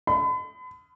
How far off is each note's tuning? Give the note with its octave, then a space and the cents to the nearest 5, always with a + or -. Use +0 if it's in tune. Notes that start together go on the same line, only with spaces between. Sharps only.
B5 +40